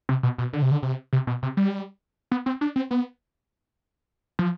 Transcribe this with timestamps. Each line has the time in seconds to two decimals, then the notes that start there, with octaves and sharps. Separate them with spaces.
0.09 C3
0.23 B2
0.38 B2
0.53 D3
0.62 C3
0.71 D3
0.83 C3
1.13 C3
1.27 B2
1.43 C3
1.57 G3
2.31 B3
2.46 C4
2.61 D4
2.76 C4
2.91 B3
4.39 F3